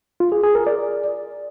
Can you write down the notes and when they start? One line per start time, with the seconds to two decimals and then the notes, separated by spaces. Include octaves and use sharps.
0.20 F4
0.32 G#4
0.43 G#4
0.55 A#4
0.67 D5